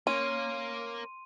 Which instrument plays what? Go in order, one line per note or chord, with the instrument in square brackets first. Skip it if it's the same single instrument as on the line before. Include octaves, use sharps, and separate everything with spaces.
[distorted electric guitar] A#3 [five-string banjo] C#4 [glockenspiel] C6 D#7